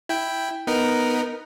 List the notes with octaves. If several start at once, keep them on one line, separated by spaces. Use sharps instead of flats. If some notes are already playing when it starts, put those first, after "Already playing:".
E4 G5
B3 D#4 A#4